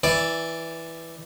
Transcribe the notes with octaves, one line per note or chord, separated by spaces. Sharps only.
E3 D5